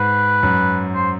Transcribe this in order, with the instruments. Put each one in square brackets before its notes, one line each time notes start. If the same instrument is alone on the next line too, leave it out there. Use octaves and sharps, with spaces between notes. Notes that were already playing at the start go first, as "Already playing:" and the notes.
Already playing: [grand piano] G#2 [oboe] B4
[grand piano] F#2
[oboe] C5